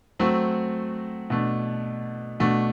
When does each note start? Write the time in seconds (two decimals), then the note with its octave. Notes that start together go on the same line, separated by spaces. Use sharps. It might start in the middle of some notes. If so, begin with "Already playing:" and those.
0.19 F#3 A3 C4 F#4
1.30 B2 A3 D4
2.40 B2 A3 D4 F#4